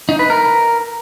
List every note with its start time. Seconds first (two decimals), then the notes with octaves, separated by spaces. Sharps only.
0.09 D#4
0.19 B4
0.30 A#4